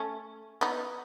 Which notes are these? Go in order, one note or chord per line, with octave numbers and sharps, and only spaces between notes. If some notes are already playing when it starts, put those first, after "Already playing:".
Already playing: A3 C#4
B3 D#4